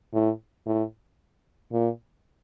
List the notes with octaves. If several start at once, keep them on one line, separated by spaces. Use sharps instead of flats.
A2
A2
A#2